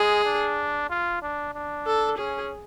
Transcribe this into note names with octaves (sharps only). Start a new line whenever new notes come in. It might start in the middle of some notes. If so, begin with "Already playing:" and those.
Already playing: G#3 G#4
D4
F4
D4
D4
A4
C#4 G#4